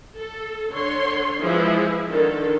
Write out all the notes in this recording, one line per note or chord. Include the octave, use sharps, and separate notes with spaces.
A4
D3 C#5 C6
E3 F3 G#3 E4 G#4
D3 D#3 A4